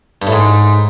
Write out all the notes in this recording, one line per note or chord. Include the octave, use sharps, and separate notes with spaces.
G2
A2
G#2